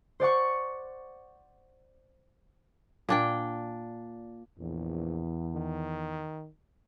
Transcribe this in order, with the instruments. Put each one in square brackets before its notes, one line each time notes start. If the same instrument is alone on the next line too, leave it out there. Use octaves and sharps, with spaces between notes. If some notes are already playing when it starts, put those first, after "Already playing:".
[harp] C5 D5 F#5 C#6
[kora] A#2 D4 G5
[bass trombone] A#1 [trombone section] E2
[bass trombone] D#3